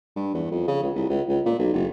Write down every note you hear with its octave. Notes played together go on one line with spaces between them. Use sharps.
G2
E2
F2
C#3
C#2
C2
C#2
C#2
A#2
B1
F#1